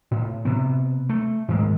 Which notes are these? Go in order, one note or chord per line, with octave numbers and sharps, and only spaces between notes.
A2
C3 B3
A3
G#2 D#3 G#3 A#3